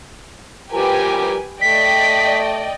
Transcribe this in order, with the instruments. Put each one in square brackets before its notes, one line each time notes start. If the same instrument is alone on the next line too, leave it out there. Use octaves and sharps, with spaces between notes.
[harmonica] F3 G3 A#4 [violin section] G4 B4 G#5
[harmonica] A3 [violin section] D5 D#5 G5 [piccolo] B6